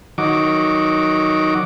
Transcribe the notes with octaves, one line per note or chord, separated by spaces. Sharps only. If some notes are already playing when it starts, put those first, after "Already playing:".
D#3 F#3 D6